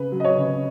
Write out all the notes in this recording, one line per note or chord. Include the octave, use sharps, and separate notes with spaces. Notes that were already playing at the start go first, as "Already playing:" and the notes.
Already playing: C#3 B4
F#3
D#5
C#5
C#3